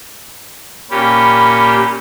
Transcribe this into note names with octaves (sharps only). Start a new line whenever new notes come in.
A#2 C#4 G4 B5